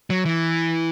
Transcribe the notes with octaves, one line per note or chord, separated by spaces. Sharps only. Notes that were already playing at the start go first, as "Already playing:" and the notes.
F#3
E3